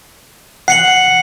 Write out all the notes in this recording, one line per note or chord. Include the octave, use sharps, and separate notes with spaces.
F#5 C7 C#7 F#7